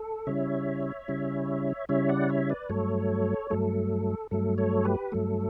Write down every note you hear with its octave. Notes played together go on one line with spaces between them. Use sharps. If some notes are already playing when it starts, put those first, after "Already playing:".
Already playing: A4
C#3 G3 C#4 E4 C#5 E5
C#3 G3 C#4 E4
C#3 G3 C#4 E4 C#5 E5
D5 F#5
C#5 E5
B4 D5
G2 F#3 A3 A4 C#5
G2 F#3 A3 A4
G2 F#3 A3 A4
A4 C#5
G4 B4
G2 F#3 A3 A4